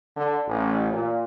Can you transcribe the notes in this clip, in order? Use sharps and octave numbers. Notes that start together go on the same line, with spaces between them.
D3
A1
A#2